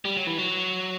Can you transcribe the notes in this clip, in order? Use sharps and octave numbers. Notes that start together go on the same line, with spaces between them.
G3
F#3
E3
F#3